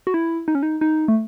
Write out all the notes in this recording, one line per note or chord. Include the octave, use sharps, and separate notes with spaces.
F#4
E4
D#4
C#4
D#4
D#4
A3